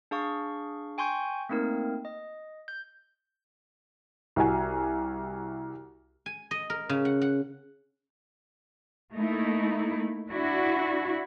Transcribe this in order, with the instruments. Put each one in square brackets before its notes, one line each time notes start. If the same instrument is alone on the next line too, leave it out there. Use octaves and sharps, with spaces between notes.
[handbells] D4 G#4 F5 C#6
G5 G#5 C6 C#6 G6
A3 A#3 C4 D#4 A#4
D#5
G6
[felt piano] C2 F#4 G#5
[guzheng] G#5
D#5
A#4
C#3
F#5
F#5
[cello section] A3 A#3 D#4 E4
D4 E4 F#4